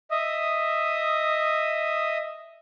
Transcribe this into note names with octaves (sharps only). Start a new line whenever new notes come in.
D#5 E5 D#6